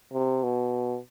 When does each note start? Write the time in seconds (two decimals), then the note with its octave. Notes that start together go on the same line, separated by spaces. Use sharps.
0.13 C3
0.43 B2